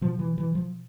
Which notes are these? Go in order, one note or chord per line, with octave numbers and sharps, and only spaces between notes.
B2 F3
E3
E3
F3